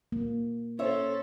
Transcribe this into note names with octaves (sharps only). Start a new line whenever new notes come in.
A#3
C#4 A4 C5 C#5 E5